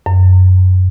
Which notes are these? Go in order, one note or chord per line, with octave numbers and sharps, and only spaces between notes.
F#2